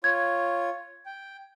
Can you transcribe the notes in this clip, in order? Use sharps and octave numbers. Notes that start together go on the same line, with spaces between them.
F4 C#5 G#6
G5